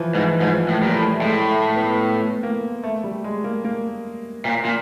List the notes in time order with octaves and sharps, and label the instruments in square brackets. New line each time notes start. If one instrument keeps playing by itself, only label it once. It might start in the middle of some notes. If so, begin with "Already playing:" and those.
Already playing: [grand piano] E3 F3
[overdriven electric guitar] G#2 [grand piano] E3
[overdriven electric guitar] G#2 [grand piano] F3
[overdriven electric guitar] A2
[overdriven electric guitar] A#2 [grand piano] G3
[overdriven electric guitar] A2
[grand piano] A3
[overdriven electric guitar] A2 [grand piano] G#3
[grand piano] A3
B3
A#3
A3
G3
G#3
A#3
A#3
[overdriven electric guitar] A#2
A#2